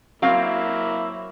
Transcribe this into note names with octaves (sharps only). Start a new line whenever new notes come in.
F#3 A#3 C4 E4 F5